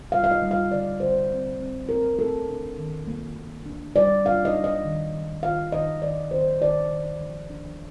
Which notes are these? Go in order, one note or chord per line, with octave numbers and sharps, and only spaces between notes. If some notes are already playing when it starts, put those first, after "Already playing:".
Already playing: C3
G3 F5
F5
D#5
G3
F5
D3 D5
D3 C5
C4
C4
C4 A#4
C4 A4
D4
D#3
A#3
A#3
D4
G3 D5
D4 F5
D#5
D4
D#5
D#3
D#3
D#3 F5
D#3 D#5
D#3 D5
D#3 C5
D#3 D5
D#3
F3
D4